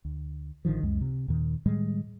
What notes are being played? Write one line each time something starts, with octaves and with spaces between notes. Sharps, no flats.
D2
A1 D3 D#3 F3
C#2 F#2 G#3
C3
D#2 A#2 D#3
A2 D#3 G3 G#3